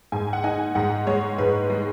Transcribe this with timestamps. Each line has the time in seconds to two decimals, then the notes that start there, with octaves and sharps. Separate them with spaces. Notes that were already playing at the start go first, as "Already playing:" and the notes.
0.12 G#2 G#5
0.33 F#5
0.44 D#4 G#5
0.75 G#2 F#5
1.07 G#3 C#5
1.38 G#2 B4
1.70 G#3